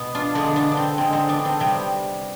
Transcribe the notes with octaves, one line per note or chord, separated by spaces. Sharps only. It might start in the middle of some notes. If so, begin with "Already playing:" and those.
Already playing: B2 B3
D4 F4
D3 G#3 B3 D4
B3 D4
D4
C4
D3 G#3 C4
C4 D#4
B3 D4
C4
C3 G3 B3